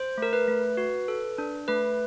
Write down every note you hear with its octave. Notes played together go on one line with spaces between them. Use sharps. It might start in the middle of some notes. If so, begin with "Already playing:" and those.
Already playing: C5
A3 A#4
B4
A3
F#4
A4
D4
A3 B4